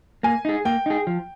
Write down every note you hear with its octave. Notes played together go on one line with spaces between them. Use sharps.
A#3 G#5
D#4 G#4
A#3 G5
D#4 G#4
F3